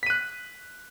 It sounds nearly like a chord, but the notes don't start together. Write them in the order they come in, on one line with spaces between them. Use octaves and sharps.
B6 D#7 F#6